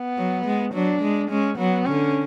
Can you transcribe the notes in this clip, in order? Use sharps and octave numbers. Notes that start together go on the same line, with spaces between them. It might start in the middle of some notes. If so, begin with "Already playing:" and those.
Already playing: B3
F#3
G#3
F#3 D4
G#3
G#3 C#4
F#3 B3
D3 C#4